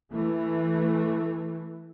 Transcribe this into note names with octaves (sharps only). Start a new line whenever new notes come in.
E3 A3